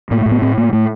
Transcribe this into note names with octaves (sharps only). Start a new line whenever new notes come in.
A2 A#3
A3
A2
B3
A2 C4
A2 A#3
A2 A3